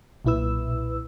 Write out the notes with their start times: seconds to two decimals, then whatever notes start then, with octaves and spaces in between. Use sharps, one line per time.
0.25 B1 A#2 E4 B4 E6